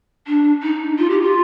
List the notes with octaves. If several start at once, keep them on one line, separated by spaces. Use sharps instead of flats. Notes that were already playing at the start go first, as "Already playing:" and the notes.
D4
D#4
F4
G4
F4